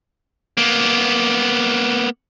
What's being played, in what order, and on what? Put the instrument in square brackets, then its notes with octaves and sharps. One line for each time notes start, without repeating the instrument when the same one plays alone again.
[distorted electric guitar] A#3 B3